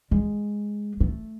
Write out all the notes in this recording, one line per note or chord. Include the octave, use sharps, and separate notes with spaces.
G#3
A3